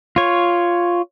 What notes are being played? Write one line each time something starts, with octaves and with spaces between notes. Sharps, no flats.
F4 C#5